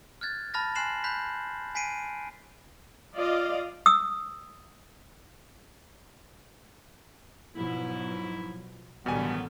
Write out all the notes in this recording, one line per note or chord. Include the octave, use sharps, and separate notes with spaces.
F6 F#6 G#6 A6
A5 B5 F6 A6 A#6
G#5 C6 F#6 C7 E7 F#7
B5 F#6 G6 B6
G#5 B6 C7 D7 D#7
F4 D5 D#5 F5
D#6 E6
G#2 B2 F3 F#3 E4
A1 B2 D3 D#3 F#3 G3 B3 G#5